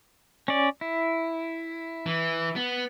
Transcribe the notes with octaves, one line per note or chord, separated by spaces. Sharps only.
C#4 D5
E4
E3
B3